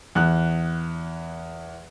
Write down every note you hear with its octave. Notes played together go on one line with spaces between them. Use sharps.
E2 F#6